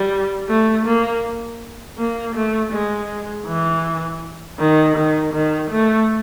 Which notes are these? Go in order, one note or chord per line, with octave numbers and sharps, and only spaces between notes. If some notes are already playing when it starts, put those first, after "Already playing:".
Already playing: G3
A3
A#3
A#3
A3
G#3
E3
D#3
D#3
D#3
A3